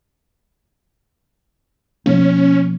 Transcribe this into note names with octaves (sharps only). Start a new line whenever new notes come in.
B2 F3 A#3 C#4